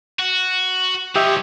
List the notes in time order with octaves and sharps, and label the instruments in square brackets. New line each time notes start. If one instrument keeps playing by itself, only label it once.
[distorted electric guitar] F#4
[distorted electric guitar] F3 C#5 [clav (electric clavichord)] G4 D#5 E5